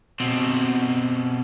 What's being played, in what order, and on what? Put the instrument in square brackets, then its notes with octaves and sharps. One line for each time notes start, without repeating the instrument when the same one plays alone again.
[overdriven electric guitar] B2 C4